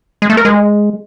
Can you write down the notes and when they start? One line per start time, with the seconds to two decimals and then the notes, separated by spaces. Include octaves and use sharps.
0.22 G#3
0.30 A3
0.37 A#4
0.45 G#3